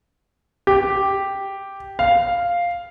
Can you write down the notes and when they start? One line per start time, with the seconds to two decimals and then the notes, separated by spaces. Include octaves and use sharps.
0.67 G4
1.99 F5